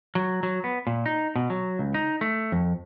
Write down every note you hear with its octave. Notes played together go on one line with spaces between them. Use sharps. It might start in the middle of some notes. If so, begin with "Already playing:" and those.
F#3
F#3
B3
A#2
D#4
B2
F#3
C#2
D#4
A3
F2